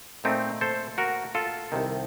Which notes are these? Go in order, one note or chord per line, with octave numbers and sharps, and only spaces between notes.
A#2 A3 C4 D#4
A4 C5
F#4 A#4
F4 A4
C2 C3 D#3